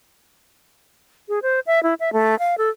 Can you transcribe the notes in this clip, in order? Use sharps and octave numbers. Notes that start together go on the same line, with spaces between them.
G#4
C5
E5
E4
E5
A3
F5
A4